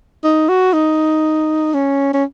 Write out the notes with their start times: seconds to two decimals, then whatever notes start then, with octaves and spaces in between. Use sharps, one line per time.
0.24 D#4
0.49 F#4
0.73 D#4
1.74 C#4
2.14 C#4